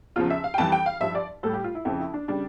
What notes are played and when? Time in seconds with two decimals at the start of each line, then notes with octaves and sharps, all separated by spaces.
0.16 E2 C#3 F3 F4
0.30 E5
0.44 F5
0.54 G5
0.58 F2 E3 G3 A5
0.72 G5
0.86 F5
1.01 G2 F3 E5
1.15 D5
1.43 A2 A4
1.47 G3
1.54 G4
1.64 F4
1.75 E4
1.85 F2 C#3 F3 E4
2.00 E4
2.14 D4
2.28 C#3 G3 D4